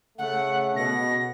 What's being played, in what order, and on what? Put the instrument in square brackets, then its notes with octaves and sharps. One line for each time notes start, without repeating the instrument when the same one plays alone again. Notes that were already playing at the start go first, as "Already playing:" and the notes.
[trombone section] C#3 A3 [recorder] F#5
[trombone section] B2 [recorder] A#6